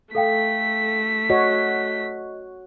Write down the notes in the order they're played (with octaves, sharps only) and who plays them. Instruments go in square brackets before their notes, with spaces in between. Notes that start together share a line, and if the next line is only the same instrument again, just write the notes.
[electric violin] A3 B6 [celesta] A4 F5 G5
[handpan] F#4 C#5 [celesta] D#5